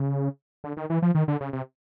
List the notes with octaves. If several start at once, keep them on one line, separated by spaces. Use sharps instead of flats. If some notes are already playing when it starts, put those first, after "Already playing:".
Already playing: C#3
D3
D#3
E3
F3
D#3
D3
C#3
C3